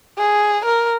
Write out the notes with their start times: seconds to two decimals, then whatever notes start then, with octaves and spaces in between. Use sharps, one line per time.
0.18 G#4
0.65 A#4